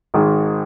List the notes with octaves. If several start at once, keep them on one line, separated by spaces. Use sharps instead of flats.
G#1 G#2 D#3 G#3